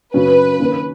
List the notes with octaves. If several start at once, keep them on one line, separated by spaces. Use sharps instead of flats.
F#2 C#3 F#3 C#4 B4
D#3 A#3 C#4